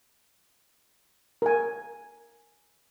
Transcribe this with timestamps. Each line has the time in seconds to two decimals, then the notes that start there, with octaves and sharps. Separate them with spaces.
1.42 A#4 G#5